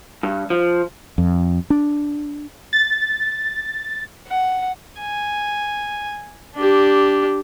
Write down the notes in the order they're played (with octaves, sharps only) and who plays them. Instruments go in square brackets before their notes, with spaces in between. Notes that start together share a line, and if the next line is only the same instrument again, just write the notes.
[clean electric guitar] G2
F3
[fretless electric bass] F2
D4
[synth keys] A6
[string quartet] F#5
[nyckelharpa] G#5
D4 G4